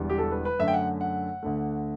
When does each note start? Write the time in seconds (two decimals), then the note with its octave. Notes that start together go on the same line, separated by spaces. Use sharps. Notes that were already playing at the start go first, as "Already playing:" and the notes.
Already playing: E1 E2 D3 G3
0.10 G4
0.18 A4
0.32 B4
0.45 B4
0.59 F#2 D3 A3 E5
0.68 G5
0.73 F#5
1.01 F#5
1.43 D2 D3 A3